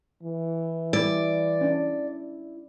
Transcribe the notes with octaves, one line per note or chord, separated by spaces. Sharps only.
E3
G3 E4 D5
C#4 D4